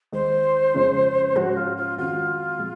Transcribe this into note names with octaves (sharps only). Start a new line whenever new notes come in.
D#2 D#3 G#3 D#4 C5
F2 C#3 F3 G#3 C#4
G#2 F3 G#3 C#4 F#4
F4
F4
F2 D#3 G#3 C4 F4 F#4
A#2 F3 G#3